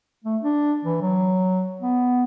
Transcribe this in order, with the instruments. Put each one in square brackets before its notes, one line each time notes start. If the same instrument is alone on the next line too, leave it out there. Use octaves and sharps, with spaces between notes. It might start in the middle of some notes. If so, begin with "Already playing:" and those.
[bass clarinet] A3
D4
E3
F#3
B3